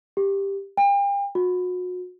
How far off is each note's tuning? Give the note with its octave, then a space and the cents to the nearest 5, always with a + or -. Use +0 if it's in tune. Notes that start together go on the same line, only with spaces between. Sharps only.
G4 +10
G5 +40
F#4 -35